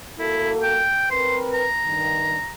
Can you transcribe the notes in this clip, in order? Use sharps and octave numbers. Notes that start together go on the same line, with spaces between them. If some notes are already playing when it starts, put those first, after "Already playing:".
A#3 E4 F#4 A4
G5
C4 A#4 B4 C6
A#5
G2 D#3